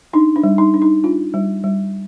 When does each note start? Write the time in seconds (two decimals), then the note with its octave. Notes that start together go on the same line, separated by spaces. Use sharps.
0.13 D4 D#4
0.36 D4
0.43 G3
0.58 D#4
0.74 D4
0.82 D#4
1.04 D4 F4
1.34 G3
1.64 G3